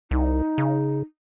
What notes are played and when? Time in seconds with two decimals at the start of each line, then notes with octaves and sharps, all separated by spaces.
0.11 C2 D#4
0.58 C#3